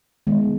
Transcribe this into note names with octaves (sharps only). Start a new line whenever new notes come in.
D#3 G#3 B3